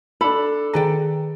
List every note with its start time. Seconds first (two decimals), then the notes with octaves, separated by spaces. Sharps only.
0.21 D4 A4 B5
0.74 D#3 G#4 B4 D5 G5 A#5